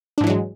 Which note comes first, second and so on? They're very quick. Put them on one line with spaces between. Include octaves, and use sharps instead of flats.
D4 G#2 E3 F#3 G#3